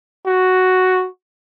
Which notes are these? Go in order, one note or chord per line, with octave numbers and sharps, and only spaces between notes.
F#4